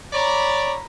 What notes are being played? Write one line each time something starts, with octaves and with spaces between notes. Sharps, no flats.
C#5 D5 A#5 B5